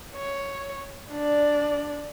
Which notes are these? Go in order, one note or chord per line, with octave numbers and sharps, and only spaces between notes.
C#5
D4 D5